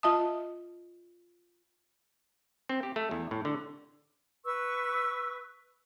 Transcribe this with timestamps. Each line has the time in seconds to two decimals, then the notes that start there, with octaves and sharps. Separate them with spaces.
0.03 F4 D#5 E5 A5 D#6
2.69 C4
2.83 G4
2.96 A3
3.11 E2
3.31 A2
3.45 D3
4.45 B4 C#6 E6